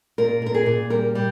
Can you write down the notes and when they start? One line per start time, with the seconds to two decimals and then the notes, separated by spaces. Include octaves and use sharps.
0.18 A#2 A#4
0.42 A#2 A#4
0.54 G#4
0.66 A#2
0.90 G3 A#4
1.15 G3